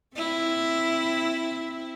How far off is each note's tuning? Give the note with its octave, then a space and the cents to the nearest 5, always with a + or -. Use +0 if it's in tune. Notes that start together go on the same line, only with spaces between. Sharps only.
C4 +0 E4 +0